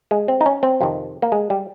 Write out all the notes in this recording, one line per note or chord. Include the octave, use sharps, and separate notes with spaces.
G#3
C4
D#4
C#4
C4
F2 C3 D#3
A#3
G#3
G3